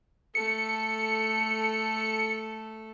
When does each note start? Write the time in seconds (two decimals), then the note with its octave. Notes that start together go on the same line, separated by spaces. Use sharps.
0.35 A3 A4 C#7